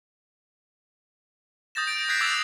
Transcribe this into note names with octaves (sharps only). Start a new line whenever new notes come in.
D#6 G6 A6 A#6 E7
D7
D#6 F#6 G#6 B6 C7
D6 E6 G6 A6 F7